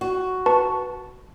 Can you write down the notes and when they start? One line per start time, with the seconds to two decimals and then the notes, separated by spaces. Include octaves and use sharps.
0.01 F#4
0.46 B4 A5 C#6